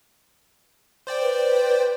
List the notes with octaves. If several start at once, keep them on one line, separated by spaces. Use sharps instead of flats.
C5 D5 G5
B4